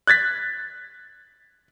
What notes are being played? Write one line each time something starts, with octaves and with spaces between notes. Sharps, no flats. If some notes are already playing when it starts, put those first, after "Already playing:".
F#6 G#6 A6 B6